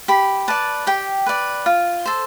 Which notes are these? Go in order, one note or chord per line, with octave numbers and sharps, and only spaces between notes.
G4 B5
B4 D5 A5
G4 G5
B4 D5
F4
A4 C5